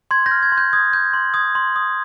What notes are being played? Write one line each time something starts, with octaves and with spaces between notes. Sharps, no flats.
C6 G#6
G6 A#6
F6
G#6
C6
G6
D#6 G#6
G6
C6
D#6 G#6
C6
D#6